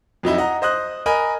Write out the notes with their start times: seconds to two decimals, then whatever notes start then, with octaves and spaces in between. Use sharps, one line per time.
0.23 F2 F#3 D#4 E4
0.38 D#5 F#5 A#5
0.62 C5 D#5 D#6 F#6
1.06 A#4 D#5 G#5 B5